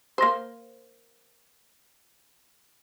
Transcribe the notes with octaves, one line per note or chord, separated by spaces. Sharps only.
A#3 C5